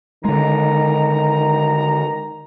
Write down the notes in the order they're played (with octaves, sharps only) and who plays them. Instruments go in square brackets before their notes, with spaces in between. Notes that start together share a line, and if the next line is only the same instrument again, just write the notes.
[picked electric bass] D3 G#3 [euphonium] D#3 [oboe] A#5